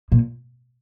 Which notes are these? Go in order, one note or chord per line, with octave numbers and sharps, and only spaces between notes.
A#2